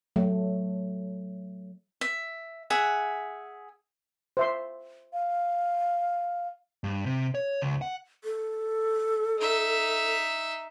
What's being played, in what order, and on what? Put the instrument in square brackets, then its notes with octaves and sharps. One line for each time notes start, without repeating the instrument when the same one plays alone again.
[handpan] F#3 A3
[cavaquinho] E5
G#4 E5 F#5
[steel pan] C5 E5 C6
[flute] F5
[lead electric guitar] G2
C3
C#5
C#2
F#5
[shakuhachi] A4
[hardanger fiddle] D#4 E5